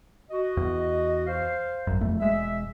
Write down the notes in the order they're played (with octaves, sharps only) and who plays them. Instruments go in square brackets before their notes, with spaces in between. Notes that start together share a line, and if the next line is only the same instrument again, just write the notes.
[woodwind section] F#4 D#5
[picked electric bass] E2
[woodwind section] C5 F5
[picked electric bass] G#1 F#2
E1 F2 A3
[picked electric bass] E1 G#3 [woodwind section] E5